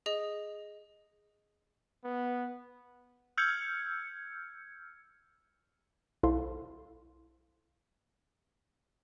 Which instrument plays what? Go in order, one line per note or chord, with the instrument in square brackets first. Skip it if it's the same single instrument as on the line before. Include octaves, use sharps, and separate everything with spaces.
[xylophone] G#4 D#5
[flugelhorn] B3
[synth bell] E6 F6 G6 G#6 C#7
[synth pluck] B1 E4 A4 C5 F5 C6